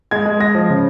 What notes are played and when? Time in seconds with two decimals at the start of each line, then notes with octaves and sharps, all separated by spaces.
0.11 G#3 G#6
0.25 G#3
0.40 G#3 A#6
0.55 F3
0.69 C#3